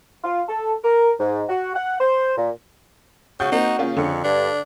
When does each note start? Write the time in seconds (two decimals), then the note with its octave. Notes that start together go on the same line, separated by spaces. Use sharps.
0.24 F4
0.49 A4
0.83 A#4
1.19 G#2
1.49 F#4
1.75 F#5
2.00 C5
2.38 A#2
3.40 C#3 F#4 G6
3.52 A#3 C4 D#4
3.78 C#3 A#3 C#4 F4
3.97 F2 D3 C#7
4.24 G2 D4